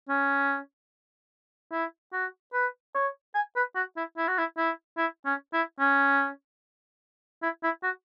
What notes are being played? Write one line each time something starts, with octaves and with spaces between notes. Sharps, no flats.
C#4
E4
F#4
B4
C#5
G#5
B4
F#4
E4
E4
F#4
E4
E4
E4
C#4
E4
C#4
E4
E4
F#4